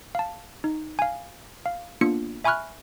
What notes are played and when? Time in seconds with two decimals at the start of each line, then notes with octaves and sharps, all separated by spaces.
0.15 F5 A5
0.64 D#4
0.99 F5 G#5
1.66 F5
2.01 A#3 B3 D4 F4 C#7
2.44 E5 G#5 B5 C#6 F6 F#6